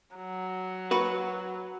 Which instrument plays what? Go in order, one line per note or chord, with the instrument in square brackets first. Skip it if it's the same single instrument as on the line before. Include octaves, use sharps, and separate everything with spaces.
[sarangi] F#3
[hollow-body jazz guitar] F#4 B4